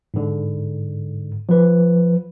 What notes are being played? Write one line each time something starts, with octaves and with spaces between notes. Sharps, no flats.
G#2 D3
F3 B4